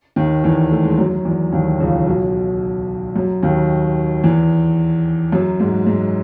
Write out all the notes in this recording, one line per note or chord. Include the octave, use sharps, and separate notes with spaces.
D#2 D#3
E2 E3
A3
G#3
F#2 F#3
E2 E3
D#2 D#3
C#2 C#3
B1 B2
F#2 F#3
D#2 D#3
E2 E3
F#2 F#3
G#2 G#3
G#2 G#3